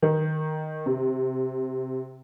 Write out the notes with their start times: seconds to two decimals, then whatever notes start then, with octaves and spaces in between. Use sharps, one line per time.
0.02 D#3
0.86 C3